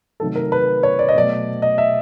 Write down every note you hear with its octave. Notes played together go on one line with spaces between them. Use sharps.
C3 D#3 F#3 A3 A4
A#4
B4
C#5
D5
D#5
B2 F#3 A3 D5
D#5
E5